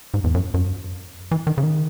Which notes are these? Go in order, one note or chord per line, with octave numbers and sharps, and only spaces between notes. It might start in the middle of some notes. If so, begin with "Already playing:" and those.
G#2
E2
F#2
F#2
E3
D#3
C#3
D#3